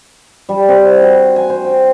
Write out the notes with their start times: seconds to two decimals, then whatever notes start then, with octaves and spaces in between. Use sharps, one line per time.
0.49 G3
0.69 C4
1.02 F#4
1.36 G#5
1.50 C5
1.64 G5